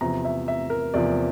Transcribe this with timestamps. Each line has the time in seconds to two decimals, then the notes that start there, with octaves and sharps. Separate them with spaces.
0.01 E2 C3 F3 A#5
0.25 E5
0.48 E5
0.70 A#4
0.94 E2 C3 F3 D5